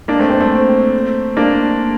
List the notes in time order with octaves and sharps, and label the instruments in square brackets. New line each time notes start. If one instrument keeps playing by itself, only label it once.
[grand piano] A#3 D4
A3 C4
A3 C4
A3 C4
A#3 D4